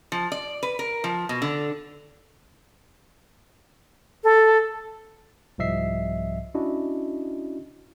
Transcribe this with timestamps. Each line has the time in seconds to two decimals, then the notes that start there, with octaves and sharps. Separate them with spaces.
0.12 F3
0.32 D5
0.63 B4
0.79 A#4
1.04 F3
1.29 B2
1.42 D3
4.24 A4
5.58 C2 G#2 F3 D#5 E5 C7
6.54 C#4 D4 E4 F#4 D#5